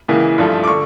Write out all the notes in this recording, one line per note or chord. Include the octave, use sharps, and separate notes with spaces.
C#2 C#3 E3 A#3
G2 F3 A3
D6
D3 C#6